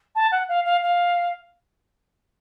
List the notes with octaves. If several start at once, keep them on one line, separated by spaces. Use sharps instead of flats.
A5
F#5
F5
F5
F5